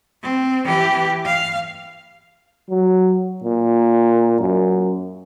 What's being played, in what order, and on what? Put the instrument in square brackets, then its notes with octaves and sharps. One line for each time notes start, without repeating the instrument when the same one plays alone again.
[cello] C4
E3 G4
F5
[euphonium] F#3
A#2
F#2